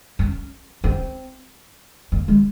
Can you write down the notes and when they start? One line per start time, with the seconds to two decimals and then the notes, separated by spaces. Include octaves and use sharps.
0.19 C#4
0.84 C4
2.12 A#3
2.28 G#3